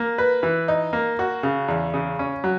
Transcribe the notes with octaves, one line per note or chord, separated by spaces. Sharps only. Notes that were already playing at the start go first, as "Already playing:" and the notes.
Already playing: A#3
B4
E3
D#4
A#3
F#4
C#3
E2
C#3
C#4
F#3